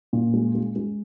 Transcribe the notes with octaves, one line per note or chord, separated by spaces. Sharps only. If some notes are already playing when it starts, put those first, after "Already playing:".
A#2
G#3
G#3
G#3